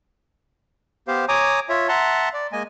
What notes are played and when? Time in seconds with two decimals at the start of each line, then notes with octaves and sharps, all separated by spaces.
1.08 B3 G4 C5 F5
1.29 C#5 G#5 A#5 D6 D#6
1.69 F4 C#5 E5
1.89 E5 F#5 A5 A#5 C6
2.34 D5
2.52 G#3 A#3 D#5 G#5